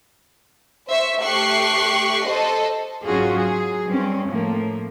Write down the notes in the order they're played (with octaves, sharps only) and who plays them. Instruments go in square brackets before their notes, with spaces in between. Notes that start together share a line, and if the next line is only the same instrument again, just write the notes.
[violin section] C5 E5 C#6
A3 G4 C#6 F#6 C7
A4 C5 D#5
[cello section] G#2 F#3 C#4 F4 F#4 G#4
F#3 G#4
G2 C4 C#4
A2 F3 A#3